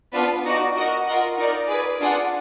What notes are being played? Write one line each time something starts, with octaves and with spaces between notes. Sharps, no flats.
B3 D4 F4 B4
D#4 F#4 D5
F#4 A#4 D#5 F#5
F4 A#4 D#5 F#5
D#4 A#4 D5
G#4 B4 D5
D4 F4 G#4 D5 F#5